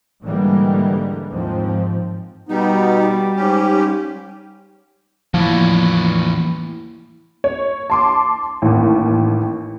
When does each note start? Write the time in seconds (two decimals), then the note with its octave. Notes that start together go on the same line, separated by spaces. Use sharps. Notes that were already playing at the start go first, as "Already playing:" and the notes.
0.22 G#2 D3 E3 G3 G#3 A#3
1.30 D#2 G#2 F3 C4
2.49 B2 G3 B3 D#4
3.36 G#2 C#4 G4
5.34 E2 A2 F3 A#3 E4 B5
7.44 C#5
7.90 A5 C6 D6
8.62 A1 D#2